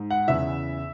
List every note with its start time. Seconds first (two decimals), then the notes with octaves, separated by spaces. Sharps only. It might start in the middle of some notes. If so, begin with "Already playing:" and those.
Already playing: G#2
0.10 F#5
0.28 E2 C#3 E3 E5